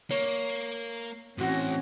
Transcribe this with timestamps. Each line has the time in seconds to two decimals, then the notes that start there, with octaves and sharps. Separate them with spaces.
0.11 A#3 C#5
1.38 A2 E3 C4 C#4 F#4